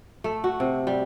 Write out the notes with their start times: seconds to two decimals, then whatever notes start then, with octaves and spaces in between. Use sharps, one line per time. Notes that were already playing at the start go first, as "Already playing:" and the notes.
0.24 A3
0.44 F#4
0.60 C3
0.87 G3